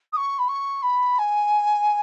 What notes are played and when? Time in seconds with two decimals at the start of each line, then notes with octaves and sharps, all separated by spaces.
0.13 D#6
0.17 C#6
0.39 B5
0.48 C#6
0.83 B5
1.19 G#5